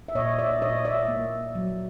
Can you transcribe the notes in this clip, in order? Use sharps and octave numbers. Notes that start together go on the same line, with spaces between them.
E5
A#2 C#5 D#5
D5 E5
A#2 C#5 D#5
D5 E5
A#3
F#3